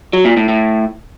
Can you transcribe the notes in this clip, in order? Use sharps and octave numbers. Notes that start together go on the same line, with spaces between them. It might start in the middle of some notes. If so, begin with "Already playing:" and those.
F#3
A#2
A2
A2